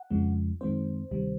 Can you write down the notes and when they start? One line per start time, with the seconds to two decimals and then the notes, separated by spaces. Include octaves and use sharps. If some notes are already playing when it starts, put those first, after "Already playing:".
Already playing: F#5
0.11 F2 C#3 F3 G#3
0.61 F#2 D#3 G#3 C4 C5
1.11 D2 C3 D#3 G3